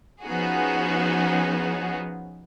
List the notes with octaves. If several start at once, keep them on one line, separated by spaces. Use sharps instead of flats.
F3 B3 C#4 D#4 F#4 G#4